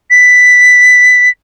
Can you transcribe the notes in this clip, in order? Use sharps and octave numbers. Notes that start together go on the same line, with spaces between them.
B6